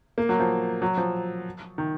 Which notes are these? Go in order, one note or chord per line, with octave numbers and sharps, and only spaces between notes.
A#3
F#3
F3
F#3
F3
D#3